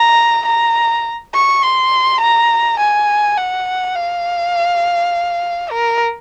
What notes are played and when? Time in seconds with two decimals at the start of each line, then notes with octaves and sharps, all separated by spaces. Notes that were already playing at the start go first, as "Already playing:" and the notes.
Already playing: A#5
0.46 A#5
1.34 C#6
1.63 C6
2.21 A#5
2.80 G#5
3.37 F#5
3.96 F5
5.71 A#4